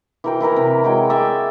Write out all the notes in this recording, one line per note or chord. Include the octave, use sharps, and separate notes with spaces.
E3 A#4 G5
E3 E4 A#4 B4
C3
G#3 F#4 C#5 G5
D5 E5 G5 G#5